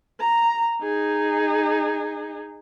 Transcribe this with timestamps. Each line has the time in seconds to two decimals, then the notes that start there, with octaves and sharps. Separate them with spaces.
0.20 A#5
0.82 D#4 G#4